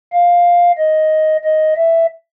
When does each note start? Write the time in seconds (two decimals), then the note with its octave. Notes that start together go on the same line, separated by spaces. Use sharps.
0.13 F5
0.78 D#5
1.44 D#5
1.77 E5